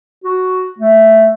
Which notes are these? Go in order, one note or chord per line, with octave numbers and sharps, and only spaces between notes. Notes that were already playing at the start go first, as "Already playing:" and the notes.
F#4
A3